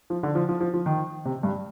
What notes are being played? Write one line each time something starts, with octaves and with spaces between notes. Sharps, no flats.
F3
D3
F3
F3
F3
F3
D#3
C3
G2